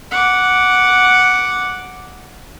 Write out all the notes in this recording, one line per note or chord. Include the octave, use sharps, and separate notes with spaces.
F#5 D6